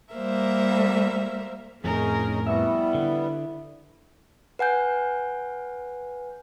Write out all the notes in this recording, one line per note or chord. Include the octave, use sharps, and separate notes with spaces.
G3 A#3 A#4 C5 E5
F2 A2 C#4 D#4 G#4 A#4
G3 B3 E4 E5 C#6
D3
B4 F#5 G#5 G6